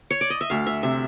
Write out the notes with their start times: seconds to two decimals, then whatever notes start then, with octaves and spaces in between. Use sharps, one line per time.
0.11 C#5
0.21 D5
0.30 D#5
0.41 E5
0.50 D2 F5
0.67 E5
0.83 C3 E5